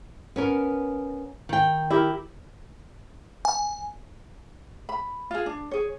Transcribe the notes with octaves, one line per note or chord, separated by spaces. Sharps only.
B3 C#4 A#4
D#3 G5
E4 G4 A#4
G#5
B5
F4 G#4
D4
G#4 C#5